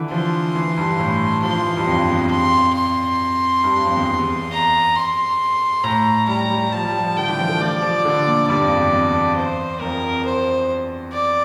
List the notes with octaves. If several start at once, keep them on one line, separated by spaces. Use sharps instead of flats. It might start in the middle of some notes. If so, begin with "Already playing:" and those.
Already playing: D3 E3
F3 C6
E3
G2
A2
F3 C6
E3
G2
F2
E2
F2 C6
C6
G2
F2
E2
E2
A#5
C6
A2 A#5
G3 A#5
G3
F3 A5
G3
F3
D3 G5
E3
F3
A3
F3 D5
F3
D3
A#2
G2 D5
F2
E2
E2
C5
F2 A#4
C5
D5